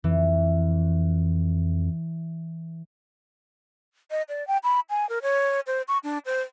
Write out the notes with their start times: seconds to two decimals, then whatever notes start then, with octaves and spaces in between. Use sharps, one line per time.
0.04 F2 E3
4.11 D#5
4.29 D5
4.47 G5
4.64 B5
4.90 G#5
5.09 A#4
5.22 C#5
5.67 C5
5.88 C#6
6.04 D4
6.26 C5